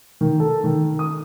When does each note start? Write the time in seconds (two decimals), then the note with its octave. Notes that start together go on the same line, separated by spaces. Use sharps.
0.21 D#3
0.40 A4
0.64 D#3
0.99 D#6